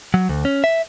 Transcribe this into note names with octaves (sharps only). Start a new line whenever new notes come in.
F#3
D2
C#4
E5